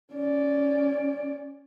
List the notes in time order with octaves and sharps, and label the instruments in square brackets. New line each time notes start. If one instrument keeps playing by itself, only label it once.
[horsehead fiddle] C#4 D5